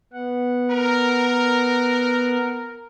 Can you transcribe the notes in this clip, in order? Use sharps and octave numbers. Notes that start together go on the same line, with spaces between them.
B3 F#5
A#4